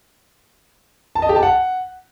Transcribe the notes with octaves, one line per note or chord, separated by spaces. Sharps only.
A5
D#5
G4
A5
F#5